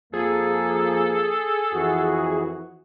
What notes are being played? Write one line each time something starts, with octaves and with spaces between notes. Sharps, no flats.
F2 F3 A#3 G#4 A4
F2 E3 F#4